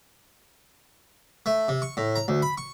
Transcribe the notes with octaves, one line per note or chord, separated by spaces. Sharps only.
A3
C3
C#6
A2
A#5
D2
B5
C#6